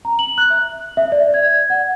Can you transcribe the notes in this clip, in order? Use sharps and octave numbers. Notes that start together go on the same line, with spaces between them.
A#5
F#7
F#6
E5
E5
D5
G#6
F#5